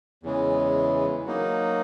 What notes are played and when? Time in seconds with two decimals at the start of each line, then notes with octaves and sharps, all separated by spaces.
0.23 E2 C#3 E3 G#3
1.26 F#3 A#3 D#4